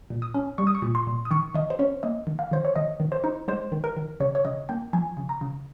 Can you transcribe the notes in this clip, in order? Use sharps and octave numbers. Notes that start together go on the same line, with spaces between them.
A#2
D#6
C#4
G3 C#6
D#6
C#6
A#2
C6
A#2
D#6
D#3 C#6
D#3 D#5
C5
C#4 C#5
A#3 D#5
D#3
F5
D#3 C5
C#5
D#3 D#5
D#3
C5
D#4
G#3 C5
D#3
A#4
D#3
C#3 C#5
C#5
C#3 D#5
A#3 G5
F3 G#5
C#3
A#5
C#3